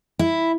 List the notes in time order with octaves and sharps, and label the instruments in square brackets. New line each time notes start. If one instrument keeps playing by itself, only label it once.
[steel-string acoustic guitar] E4